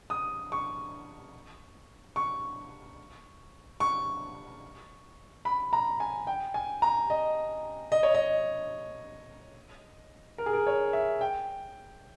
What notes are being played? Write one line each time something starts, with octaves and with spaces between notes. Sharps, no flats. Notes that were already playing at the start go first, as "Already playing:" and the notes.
D#6
C#6
C#6
C#6
B5
A#5
G#5
G5
G#5
A#5
D#5
D#5
C#5
D#5
A#4
G#4
A#4
C#5
E5
G5